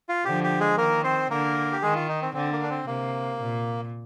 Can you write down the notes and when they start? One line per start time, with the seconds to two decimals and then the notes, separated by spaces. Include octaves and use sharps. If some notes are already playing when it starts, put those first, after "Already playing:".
0.09 F4
0.25 D3 F3 G4
0.44 G4
0.60 G#3 G#4
0.77 D#3 A#3 A#4
1.04 C4 C5
1.30 D3 A#3 A#4
1.72 G4
1.82 D#3 G#3 G#4
1.96 F4
2.08 D#4
2.22 C4
2.34 D3 C4
2.52 A#3
2.63 D4
2.70 C4
2.87 C3 A#3
3.40 A#2